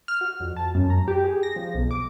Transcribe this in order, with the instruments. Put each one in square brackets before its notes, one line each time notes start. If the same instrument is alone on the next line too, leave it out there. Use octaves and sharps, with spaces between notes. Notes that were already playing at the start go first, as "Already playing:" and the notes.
[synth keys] F6
F#4
F2
A5
F#2
A#5
G4
G#4
A#6
F3
B1
D6